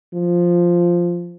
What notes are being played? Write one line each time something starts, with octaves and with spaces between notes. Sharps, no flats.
F3